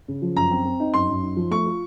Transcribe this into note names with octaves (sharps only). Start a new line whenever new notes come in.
C#3
F3
F#2 A#5
C4
C4
D#4
F#2 C6
F#2
D#4
F3
A3 C#6
F4